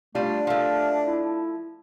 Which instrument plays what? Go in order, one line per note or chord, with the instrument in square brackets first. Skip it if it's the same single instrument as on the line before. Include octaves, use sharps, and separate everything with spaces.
[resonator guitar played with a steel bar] G3 F4 [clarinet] A3 [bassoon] D4
[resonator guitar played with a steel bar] F3 A3 [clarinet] F5
[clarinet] E4